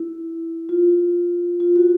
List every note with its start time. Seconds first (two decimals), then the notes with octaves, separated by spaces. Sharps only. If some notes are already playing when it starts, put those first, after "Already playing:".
Already playing: E4
0.69 F4
1.60 F4
1.76 F#4